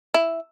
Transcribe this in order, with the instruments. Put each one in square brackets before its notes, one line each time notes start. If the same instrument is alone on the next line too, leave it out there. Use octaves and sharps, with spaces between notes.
[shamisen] E4